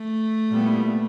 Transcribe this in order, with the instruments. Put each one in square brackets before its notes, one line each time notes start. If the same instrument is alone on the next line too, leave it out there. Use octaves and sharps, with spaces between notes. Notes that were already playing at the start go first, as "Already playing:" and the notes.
Already playing: [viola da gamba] A3
[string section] A#2 G3 B3 E4